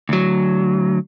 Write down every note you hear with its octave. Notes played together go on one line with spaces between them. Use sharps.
D2 F#3